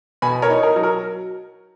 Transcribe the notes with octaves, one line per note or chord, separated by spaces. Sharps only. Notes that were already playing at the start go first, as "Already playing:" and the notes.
B2 G#5 B5
A#4 C#5
D#4
A#4
F#3
A#4